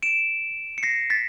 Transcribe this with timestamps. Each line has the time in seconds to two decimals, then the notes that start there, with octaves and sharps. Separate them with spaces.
0.03 D7 E7
0.78 C#7
0.83 A#6 C7
1.10 A6 B6